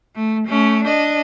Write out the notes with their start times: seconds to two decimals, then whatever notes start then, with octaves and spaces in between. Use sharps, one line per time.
0.15 A3
0.47 A3 C#4
0.85 D4 D#5